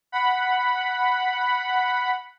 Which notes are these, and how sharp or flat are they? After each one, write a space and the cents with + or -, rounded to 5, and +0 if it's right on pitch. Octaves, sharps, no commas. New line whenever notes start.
F#5 +0 B5 +0